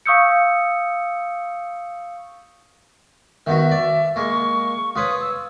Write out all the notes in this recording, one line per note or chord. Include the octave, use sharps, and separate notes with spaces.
F5 C#6 D#6 E6 G6 C#7
D#3 B3 F#4 E5
D5
G#3 A#3 C#6
F4 B4 C#5 D#6
E6